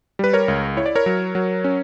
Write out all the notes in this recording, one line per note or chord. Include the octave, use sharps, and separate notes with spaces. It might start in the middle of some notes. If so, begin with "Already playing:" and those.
G3 B4
A#4 C#5
C#2
E4 C#5
D5
A#4 C#5
F#3
F#3
C#4